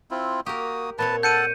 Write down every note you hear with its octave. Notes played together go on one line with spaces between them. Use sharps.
C4 E4 F4
A#3 F#4 G4 A#4 D#6
A#2 C4 B4 C#5 A5
A4 F#5 A5 G6 C#7 D#7